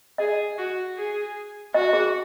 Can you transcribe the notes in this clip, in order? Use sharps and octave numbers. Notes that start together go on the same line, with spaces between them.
G#4 D#5
F#4
G#4
F#4 D#5
G#4